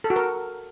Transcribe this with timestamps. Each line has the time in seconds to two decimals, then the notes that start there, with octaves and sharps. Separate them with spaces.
0.04 A4
0.10 F#4
0.16 A#4